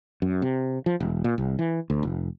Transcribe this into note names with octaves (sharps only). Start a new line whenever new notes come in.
F#2
C3
F3
E1
A#2
C2
E3
D2
F1